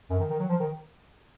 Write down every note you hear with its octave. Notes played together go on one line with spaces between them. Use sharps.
F#2
D#3
D#3
F#3
F3
D#3